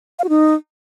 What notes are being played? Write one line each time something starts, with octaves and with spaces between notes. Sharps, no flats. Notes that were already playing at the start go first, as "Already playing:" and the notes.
F5
F#4
D#4